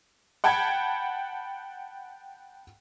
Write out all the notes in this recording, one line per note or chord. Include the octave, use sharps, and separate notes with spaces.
F#5 G5 A5 B5 G#6